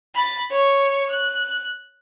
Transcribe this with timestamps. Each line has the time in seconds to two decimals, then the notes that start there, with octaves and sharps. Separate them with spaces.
0.15 B5 A6
0.51 C#5 C#6
1.10 F#6